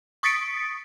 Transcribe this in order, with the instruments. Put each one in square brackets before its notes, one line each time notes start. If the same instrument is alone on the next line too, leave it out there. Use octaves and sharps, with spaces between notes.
[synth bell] C#6 D#6 A6 B6 C#7 D7